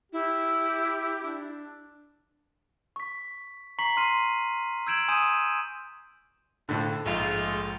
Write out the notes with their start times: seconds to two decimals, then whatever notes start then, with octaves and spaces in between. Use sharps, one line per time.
0.12 E4 G4
1.24 D4
2.96 C#6 B6
3.79 A#5 C#6 B6 C7 F#7
3.97 C6 F6 C7 D#7
4.87 E6 G6 G#6 D7 E7 F#7
5.08 G#5 C6 D#6 G6 D#7 E7
6.69 F2 A2 D3
7.06 A#1 G#2 G#3 A3 F4